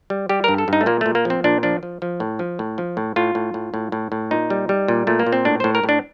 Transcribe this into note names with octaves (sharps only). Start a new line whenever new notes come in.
G3
G3 G4
G2 A#4
A4
G2 D#4
A3
A#2 A#3
A#2 A3
A#3
F3 C4
A#2 D4
F3 D4
F3
F3
A2
F3
A2
F3
A2
A2 F4
A2
A2
A2
A2
A2
A#2 D#4
G3
G3
A#2
A#2 A3
A#3
A#2
C4
A2 D4
A2 C5
A#4
A2
D4